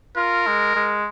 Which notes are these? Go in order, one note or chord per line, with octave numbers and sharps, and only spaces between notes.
F4 A#4
G#3
G#3